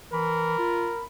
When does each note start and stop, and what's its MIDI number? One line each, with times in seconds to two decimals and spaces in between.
0.12 0.55 52
0.12 1.04 70
0.12 1.05 83
0.59 0.91 65